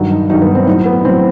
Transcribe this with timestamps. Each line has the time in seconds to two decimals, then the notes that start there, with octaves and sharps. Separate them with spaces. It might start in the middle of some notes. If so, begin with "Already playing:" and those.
Already playing: G2 D#3 F#3
0.11 D#4
0.30 G2 D#3 F#3 D#4
0.41 B3
0.55 C4
0.67 A2 D#4
0.70 F#3
0.85 B3
1.05 A2 C4
1.09 F#3